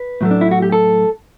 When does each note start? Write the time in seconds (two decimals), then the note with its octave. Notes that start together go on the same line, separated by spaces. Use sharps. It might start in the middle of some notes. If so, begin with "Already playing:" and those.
Already playing: B4
0.21 A2 F#3 A3
0.31 D4
0.41 E4
0.51 F#4
0.62 G4
0.72 A4